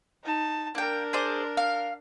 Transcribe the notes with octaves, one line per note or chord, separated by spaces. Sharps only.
D#4 A5
A#3 D4 A#4 G5
G#4 C5 D5
F5